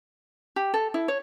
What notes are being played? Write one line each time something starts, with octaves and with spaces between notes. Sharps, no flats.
G4
A4
E4
C#5